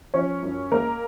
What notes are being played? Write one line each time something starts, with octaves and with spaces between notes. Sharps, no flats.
F3 C#4 C#5
F#2
G#3 A#3 A#4